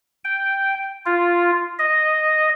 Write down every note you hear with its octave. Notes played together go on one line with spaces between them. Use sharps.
G5
F4
D#5